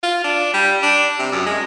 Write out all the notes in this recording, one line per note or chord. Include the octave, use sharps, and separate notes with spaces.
F4
D4
G3
D4
C3
F#2
G#3